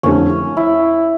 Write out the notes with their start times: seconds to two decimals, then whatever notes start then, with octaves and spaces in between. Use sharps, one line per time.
0.03 F2 D3 A3 C#4 E4 G4
0.57 E4